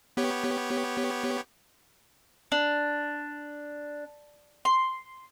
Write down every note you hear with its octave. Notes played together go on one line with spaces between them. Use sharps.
B3 G4 C#5
D4
C6